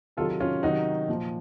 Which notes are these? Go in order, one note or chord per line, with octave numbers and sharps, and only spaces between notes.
C3 D#3 F#3 F4 A4
C#4 F4
C3 D#3 F#3 D#4 F#4
A#2 F3